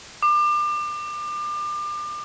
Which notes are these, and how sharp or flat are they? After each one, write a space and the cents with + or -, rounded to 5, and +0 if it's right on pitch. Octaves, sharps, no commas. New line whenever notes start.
D6 +30